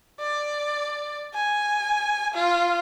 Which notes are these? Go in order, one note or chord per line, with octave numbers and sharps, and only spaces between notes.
D5
G#5
F4